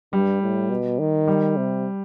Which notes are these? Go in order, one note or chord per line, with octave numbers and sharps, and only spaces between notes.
G2 G3
A2
B2
D#3
G3
C3